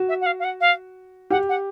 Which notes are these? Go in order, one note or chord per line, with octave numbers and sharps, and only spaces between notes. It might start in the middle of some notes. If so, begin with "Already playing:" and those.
Already playing: F#4
E5
F#5
F5
F5
F#5
F5
G4 F#5
F#5